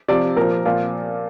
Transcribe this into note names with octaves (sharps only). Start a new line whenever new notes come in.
C3 F3 D5
A#2 F3 A#4
A#2 F3 F4